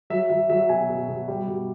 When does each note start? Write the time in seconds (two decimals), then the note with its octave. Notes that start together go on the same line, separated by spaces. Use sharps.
0.10 F#3 E5
0.30 F#3 E5
0.50 F#3 E5
0.69 B2 G#5
0.89 B2
1.08 B2
1.28 G3
1.47 B2